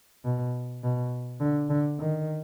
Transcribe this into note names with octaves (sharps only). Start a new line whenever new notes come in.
B2
B2
D3
D3
D#3